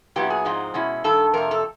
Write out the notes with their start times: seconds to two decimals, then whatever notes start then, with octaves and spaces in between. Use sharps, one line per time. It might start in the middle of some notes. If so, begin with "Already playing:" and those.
0.16 A#2 F#3 B3 E4 G4
0.30 G#4
0.45 G#2 F3 G#3 C4 D#4
0.74 B2 G#3 C#4 E4
1.04 G2 D#3 A4
1.33 F2 C3 A3 A#4
1.51 A4